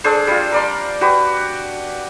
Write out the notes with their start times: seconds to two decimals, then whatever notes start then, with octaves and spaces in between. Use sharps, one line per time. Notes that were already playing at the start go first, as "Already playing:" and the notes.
0.04 D4 G#4 A4 C5
0.27 G3 F4
0.52 A#4 D5 C6
1.01 F#4 G4 B4